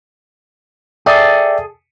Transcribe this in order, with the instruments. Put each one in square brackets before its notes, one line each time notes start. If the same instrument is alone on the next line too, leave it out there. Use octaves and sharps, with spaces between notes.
[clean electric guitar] G#4 A4 [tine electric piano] D5 E5 G5